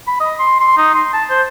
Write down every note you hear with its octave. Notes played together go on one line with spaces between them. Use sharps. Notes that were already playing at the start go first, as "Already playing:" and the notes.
B5
D#5
C6
C6
D#4
C6
A5
C5